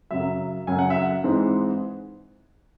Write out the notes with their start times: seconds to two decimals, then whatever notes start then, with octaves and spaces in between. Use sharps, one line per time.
0.11 F#2 C#3 F#3 E5
0.67 F#2 C#3 F#3 G#5
0.79 F#5
0.90 E5
1.02 F#5
1.24 G#2 E3 G#3 C4